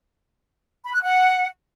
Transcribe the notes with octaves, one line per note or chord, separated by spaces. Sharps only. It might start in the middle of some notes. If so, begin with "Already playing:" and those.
B5
F#6
F#5